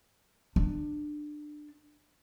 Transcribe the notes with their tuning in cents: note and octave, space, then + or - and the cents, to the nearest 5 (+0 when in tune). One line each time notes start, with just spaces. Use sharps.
D4 +20